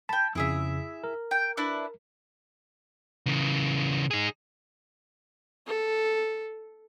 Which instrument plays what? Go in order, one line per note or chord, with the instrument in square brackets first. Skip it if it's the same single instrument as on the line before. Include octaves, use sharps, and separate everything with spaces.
[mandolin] G5 B5 [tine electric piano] A5
[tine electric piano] F2 C#3 [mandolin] E4 G#4 E5
[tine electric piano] A#4
[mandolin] G5
D4 E4 B4
[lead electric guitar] C#3 E3
D#4 G#4
[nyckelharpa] A4